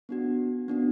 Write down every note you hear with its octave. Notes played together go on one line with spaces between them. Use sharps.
B3 D4 F#4
B3 D4 F#4